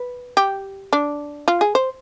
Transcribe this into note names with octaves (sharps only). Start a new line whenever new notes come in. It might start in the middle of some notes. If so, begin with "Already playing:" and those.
Already playing: B4
G4
D4
F4
G#4
C5